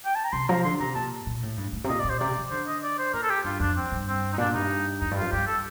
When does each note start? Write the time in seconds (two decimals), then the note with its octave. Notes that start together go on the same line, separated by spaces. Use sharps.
0.05 G5
0.15 A5
0.24 A#5
0.33 C3 C6
0.49 F3 A#5
0.64 D3 C6
0.80 C3 A#5
0.95 A#2 A5
1.27 A#2
1.43 A2
1.58 G2
1.73 A2
1.84 C3
1.89 A#2 D#5
1.99 D5
2.05 A#2 C5
2.19 C3 D5
2.36 F3
2.51 D3 C5
2.67 D#5
2.83 D5
2.98 C5
3.14 A#2 A#4
3.23 A4
3.30 G4
3.44 G2 F4
3.60 F2 D4
3.77 C4
3.92 G2
4.08 C4
4.33 D#4
4.38 A#2 D4
4.54 G2 D#4
5.00 F2 D#4
5.11 G2
5.17 F2 F4
5.32 G2 G4
5.47 A4